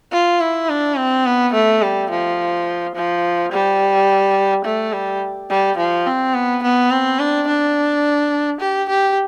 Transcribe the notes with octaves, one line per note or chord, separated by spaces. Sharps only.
F4
E4
D4
C4
B3
A3
G3
F3
F3
G3
A3
G3
G3
F3
C4
B3
B3
C4
D4
D4
G4
G4